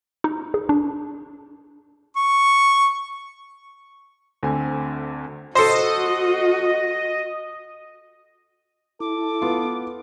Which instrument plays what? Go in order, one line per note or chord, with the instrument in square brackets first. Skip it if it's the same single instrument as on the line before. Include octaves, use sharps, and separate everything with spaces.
[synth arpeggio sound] D#4
G#4
D4
[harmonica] C#6
[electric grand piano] D2 D3 C4 G#5
[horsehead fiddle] F#4 [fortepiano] A4 C5 [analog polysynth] D#5
[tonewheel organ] E4 [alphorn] A4 [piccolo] D6
[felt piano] B3 F4